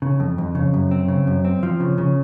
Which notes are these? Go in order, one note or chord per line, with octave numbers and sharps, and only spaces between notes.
C#3
F2
F2
C#3
F#2
C4
C#3
F#2
C4
F3
C#3
C#3